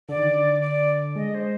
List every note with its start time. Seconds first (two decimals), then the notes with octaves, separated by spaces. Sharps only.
0.09 D3 D5
0.18 D#3
0.28 D3
0.62 D5
1.16 G#3 D#5
1.34 C5